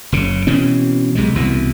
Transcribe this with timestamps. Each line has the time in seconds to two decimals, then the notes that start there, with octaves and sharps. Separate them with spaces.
0.12 F#1 C#3
0.47 B2 E3 C4 C#4
1.15 B1 C3 G#3
1.35 C2 B2 E3